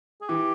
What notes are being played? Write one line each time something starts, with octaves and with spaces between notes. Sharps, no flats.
G#4
E3 G4